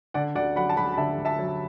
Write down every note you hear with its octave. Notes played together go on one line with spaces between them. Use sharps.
D3 D5 F#5
D2 D5 F#5
F#3 F#5 B5
A5
D2 F#5 B5
B5
D3 E5 A5
D2
E5 A5
F#3